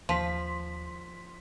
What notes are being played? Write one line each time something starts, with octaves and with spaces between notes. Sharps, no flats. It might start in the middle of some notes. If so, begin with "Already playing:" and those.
D#2 F3 C6 B6